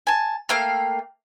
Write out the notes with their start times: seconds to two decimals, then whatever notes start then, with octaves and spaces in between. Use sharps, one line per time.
0.07 G#5 A5
0.49 A3 A#3 F5 G5